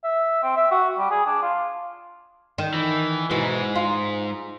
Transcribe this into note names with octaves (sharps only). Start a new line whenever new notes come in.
E5
C4
E5
F#4
G3
G#4
D4
F4
D#3
E3
G#2 B2 E3 G#3
F4